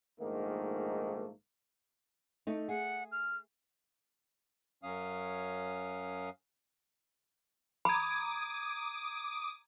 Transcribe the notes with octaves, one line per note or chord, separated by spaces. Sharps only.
A#1 G#2 D#3 A3 A#3
A3 D#4
G#4 F#5
F6
F#2 F#3 C#4 F5 D#6
A#5 B5 D6 D#6 G#6